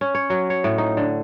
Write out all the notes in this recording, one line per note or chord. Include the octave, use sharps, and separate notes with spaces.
C#4
C#5
F#3
C#5
A2
D#4
D3